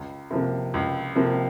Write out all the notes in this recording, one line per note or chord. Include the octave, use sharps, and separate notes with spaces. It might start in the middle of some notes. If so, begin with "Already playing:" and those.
Already playing: C#2
C3 F3 A#3
C#2
C3 F3 A#3